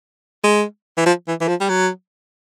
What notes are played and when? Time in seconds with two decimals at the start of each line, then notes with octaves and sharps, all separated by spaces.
0.44 G#3
0.97 E3
1.06 F3
1.27 E3
1.41 E3
1.48 F3
1.60 G3
1.69 F#3